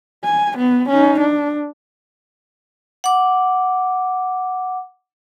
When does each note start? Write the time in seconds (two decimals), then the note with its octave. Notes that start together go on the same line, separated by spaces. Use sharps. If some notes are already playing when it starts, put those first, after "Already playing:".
0.24 G#5
0.58 B3
0.89 C#4 D#4
1.20 D4
3.04 F#5 D6